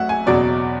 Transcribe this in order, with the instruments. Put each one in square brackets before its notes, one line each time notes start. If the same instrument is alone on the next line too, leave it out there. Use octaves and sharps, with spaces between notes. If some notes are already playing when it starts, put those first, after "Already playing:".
Already playing: [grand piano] A1 A2 F#3 E5 F#5
G#5
F#1 E2 B2 F#3 D5